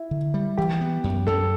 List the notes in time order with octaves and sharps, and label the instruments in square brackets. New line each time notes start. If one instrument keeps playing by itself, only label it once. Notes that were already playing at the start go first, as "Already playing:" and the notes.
Already playing: [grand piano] E4
[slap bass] D3
G3
[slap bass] E3 [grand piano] G4
[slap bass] B3
F#2
[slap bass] F#2 [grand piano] A4